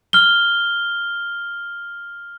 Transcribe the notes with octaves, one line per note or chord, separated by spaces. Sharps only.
F6 G7